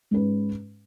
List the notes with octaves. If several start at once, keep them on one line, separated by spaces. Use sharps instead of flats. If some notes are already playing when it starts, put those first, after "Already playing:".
G#2 G#3 C#4 B4